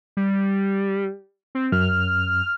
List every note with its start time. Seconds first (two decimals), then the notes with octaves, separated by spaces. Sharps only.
0.17 G3
1.55 C4
1.72 F#2 F6